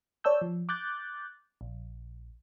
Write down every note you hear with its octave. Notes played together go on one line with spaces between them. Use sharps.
C#5 D5 A5 E6 G6
F3
D6 F#6 G6 A6
A#1